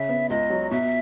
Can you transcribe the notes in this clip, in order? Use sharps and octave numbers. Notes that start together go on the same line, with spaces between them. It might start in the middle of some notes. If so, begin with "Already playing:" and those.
Already playing: C#3 E5
B3
C#2 D#5
F#3
B2 E5